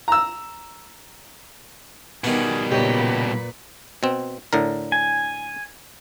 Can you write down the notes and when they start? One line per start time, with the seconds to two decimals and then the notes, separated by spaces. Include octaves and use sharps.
0.08 A#5 E6
2.24 B2 D#3 G3 B3 G#4
2.71 A#2 C#3 G4 B4 D#5
4.03 B2 C4
4.53 A2 D3 A#4
4.92 G#5